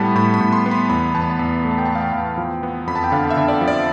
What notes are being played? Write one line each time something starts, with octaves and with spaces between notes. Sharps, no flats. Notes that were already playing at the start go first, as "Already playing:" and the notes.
Already playing: A2 G3 B3 A5 B5
A2 B5
B5
A2
C6
B3
B5
E2 B5
E2 A5
B5
A5
E2 B5
A3 B5
A5
G5
A3 A5
F5
G5
E2
F3
B3
F2 B5
A5
G5
D3 F5
E5
D3
D5
F3
D5